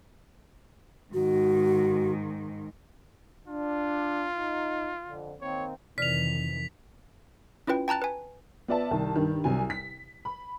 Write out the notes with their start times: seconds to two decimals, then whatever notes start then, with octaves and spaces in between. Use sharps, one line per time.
1.14 G#2 D#3 F#4
3.48 D4 F4
4.37 D#4
5.07 F2 D3
5.41 D#3 A#3 C4 C#5
5.98 F2 C3 D#3 E3 D5 F6 B6 F7
7.67 C#4 E4 F4 B4 G5
7.88 G5 A5 A#5 F#6 A6
8.02 B4 G#5
8.68 B3 F4 D5 E5 A5
8.91 C2 D#3 A5
9.15 G2 D#3
9.44 C2 C3 F#3 G#5
9.70 B6
10.25 B5